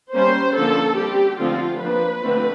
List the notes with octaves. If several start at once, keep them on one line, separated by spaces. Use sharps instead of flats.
G3 A#3 C#4 C5
D3 F3 A#3 C#4 A4
G3 C4 G4
D3 F3 A3 C4 F4
F3 A#3 D4 B4
D3 F3 A3 C4